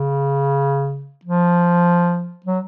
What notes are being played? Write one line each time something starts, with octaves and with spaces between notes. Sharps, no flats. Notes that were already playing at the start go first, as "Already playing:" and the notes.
Already playing: C#3
F3
F#3